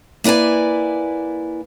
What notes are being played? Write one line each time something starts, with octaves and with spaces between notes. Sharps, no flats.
A#3 E4 B4 D5 G#5